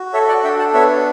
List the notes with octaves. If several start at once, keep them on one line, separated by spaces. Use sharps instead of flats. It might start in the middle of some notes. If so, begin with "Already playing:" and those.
Already playing: F#4
A4 C#5 E5
D5 F#5
D4 E5 G5
F#5 A5
B3 C#5 E5